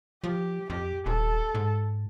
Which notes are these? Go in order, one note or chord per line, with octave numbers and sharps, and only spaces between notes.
F3 G4
F2 G4
D#1 A4
G#2